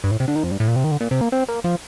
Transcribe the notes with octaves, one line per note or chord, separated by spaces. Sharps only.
G2
A2
C3
D3
D#3
F2
G2
A2
A#2
C3
D#3
D3
A#2
C3
A#3
C4
A#3
F3